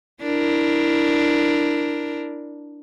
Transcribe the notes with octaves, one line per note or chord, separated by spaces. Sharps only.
D4 E4 A#4